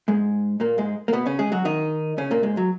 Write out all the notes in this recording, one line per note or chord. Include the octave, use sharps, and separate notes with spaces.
G#2 G#3
A#2 A#3
G#2 G#3
A#3
B2 B3
C#3 C#4
G#3 G#4
F#3 F#4
D#3 D#4
C#3 C#4
A#2 A#3
G#2 G#3
F#3